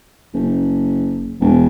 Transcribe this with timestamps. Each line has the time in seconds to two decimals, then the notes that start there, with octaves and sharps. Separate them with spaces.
0.34 F#1
1.40 E1